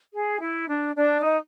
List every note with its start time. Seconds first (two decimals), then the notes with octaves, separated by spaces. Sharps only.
0.14 G#4
0.40 E4
0.68 D4
0.95 D4
1.22 D#4